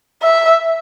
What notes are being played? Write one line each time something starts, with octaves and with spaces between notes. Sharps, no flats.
E5